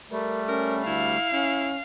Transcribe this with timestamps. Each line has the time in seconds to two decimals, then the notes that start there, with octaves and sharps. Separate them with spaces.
0.11 G3 A3 A#4
0.48 C#4 A#4
0.86 D2 E4 F5
1.33 C#4 E4